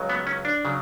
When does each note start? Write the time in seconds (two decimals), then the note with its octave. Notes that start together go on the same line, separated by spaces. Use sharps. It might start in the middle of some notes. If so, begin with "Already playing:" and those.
Already playing: C#2 C#3 F#3
0.10 B3
0.27 C#4
0.45 D4
0.65 C#3 F#3